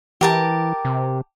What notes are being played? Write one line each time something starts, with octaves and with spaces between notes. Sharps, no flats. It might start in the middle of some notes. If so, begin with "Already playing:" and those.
E3 G4 A#4 A5
C3